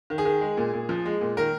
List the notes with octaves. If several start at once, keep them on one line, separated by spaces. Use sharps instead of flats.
D#3
G#4
D#3
G#3
A#2
A#2
F3
G#3
A#2
D#3 A#4